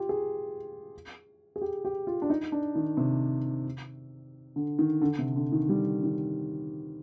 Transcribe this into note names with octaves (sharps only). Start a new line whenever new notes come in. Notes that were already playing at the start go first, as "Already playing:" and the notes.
Already playing: F4 G4
G#4
G#4
G4
G4
F4
D4
D#4
D4
D#3
C3
D3
D#3
D3
C3
D3
D#3
G3
D#3